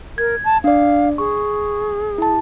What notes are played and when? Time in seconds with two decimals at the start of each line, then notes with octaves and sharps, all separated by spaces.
0.18 A#4 G#6
0.44 A5
0.64 D4 D5 F5
1.18 G#4 C#6
2.18 E4 A5